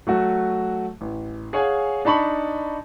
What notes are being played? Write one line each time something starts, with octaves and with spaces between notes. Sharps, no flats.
F#3 A3 F#4
A1
G#4 C#5 F5 F#5 G#5
D4 D#4 A5 B5 C#6 F#7